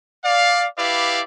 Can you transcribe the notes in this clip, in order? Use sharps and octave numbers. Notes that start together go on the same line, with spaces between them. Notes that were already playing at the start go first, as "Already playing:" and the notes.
D5 F5
E4 G4 B4 D5 F5